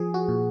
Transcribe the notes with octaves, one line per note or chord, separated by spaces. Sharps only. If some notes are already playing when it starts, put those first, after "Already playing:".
Already playing: F3 G#4
F#4
A#2